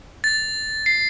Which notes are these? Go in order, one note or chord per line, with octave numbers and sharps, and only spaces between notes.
A6
C7